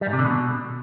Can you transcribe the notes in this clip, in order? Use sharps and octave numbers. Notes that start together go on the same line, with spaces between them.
G3
G#2
C3
D3
B2